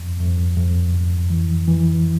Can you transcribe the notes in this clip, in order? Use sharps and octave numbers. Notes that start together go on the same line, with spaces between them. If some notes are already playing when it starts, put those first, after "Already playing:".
Already playing: F2
F2
F2
F2
E3
E3